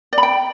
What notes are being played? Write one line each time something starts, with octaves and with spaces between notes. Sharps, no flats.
D5
B5
G5